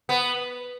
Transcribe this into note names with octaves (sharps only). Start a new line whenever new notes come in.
B3